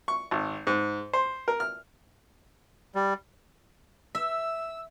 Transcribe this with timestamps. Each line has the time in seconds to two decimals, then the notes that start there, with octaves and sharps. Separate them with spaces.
0.08 C#6
0.31 G#1
0.67 G#2
1.13 C5
1.48 A#4
1.60 F6
2.95 G3
4.15 E5 E6